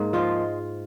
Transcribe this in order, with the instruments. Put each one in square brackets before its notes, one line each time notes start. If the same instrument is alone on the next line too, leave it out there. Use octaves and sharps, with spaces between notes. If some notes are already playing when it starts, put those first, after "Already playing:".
Already playing: [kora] G#2 A#3
F3 G#3 F4